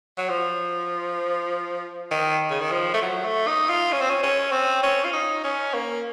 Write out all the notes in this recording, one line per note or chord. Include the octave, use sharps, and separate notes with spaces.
F#3
F3
D#3
C#3
D#3
F3
A3
F#3
A3
D#4
F4
C#4
C4
C#4
C#4
C4
C#4
F4
D#4
C#4
A#3